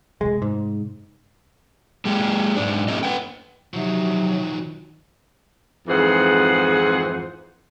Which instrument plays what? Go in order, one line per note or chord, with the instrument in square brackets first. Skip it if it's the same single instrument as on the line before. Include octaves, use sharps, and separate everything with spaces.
[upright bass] C3 A3 [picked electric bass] G#3
[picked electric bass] G#2
[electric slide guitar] G#3 A#3 G4
G#2 D4
A3 A#3 C#4 E4 G4 D#5
B4 F#5 G5
[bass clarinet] C3 [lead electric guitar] D#3 F3 [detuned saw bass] F#3
[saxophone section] F2 G#2 E3 G#4 C5 F#5